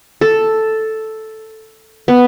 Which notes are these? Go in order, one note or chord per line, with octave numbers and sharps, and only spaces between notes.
A4
B3